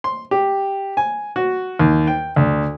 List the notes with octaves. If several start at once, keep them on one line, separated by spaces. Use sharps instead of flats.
C6
G4
G#5
F#4
D#2
G5
D2